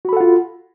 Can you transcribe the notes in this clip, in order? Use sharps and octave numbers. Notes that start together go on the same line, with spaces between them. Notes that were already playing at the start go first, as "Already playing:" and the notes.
F4 F#4 A4 F#5 B5